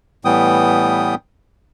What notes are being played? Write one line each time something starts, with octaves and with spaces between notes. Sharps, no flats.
A2 E3 G3 B3 G5 D#6